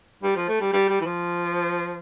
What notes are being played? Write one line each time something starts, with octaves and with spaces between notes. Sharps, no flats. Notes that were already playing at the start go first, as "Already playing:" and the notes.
G3
F3
A3
G3
G3
G3
E3
F3